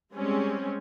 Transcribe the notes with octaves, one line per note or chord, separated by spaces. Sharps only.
G3 G#3 C4 C#4